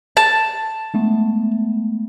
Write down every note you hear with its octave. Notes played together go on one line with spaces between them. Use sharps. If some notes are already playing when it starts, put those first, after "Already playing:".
A5
G#3 A3 B3